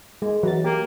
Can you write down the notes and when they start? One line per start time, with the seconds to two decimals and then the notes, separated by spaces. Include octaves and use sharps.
0.22 G#3
0.43 E3 F#3 A#5 A6
0.64 A#3 G4